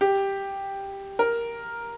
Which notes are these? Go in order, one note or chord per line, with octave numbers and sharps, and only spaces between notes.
G4
A#4